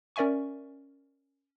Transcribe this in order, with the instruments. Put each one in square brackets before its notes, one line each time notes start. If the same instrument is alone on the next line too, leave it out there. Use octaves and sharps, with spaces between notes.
[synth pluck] C#4 A#4 D5 E5 G#5 C#6